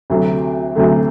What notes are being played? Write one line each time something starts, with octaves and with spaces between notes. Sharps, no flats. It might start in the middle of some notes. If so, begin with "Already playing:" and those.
D2 C3 F#3 A3
D2 C3 F#3 A3